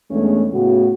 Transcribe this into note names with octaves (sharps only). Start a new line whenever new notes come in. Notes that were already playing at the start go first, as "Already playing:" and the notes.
E2 G#3 A3 C#4 D4 C#5
A2 C#3 B3 C#4 F#4